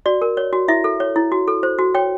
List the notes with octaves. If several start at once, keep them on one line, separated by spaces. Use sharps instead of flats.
F#4 D5
A#4
C#5
F#4
E4 E5
A4
C#5
E4
F#4
A4
C5
F#4
C#5 G5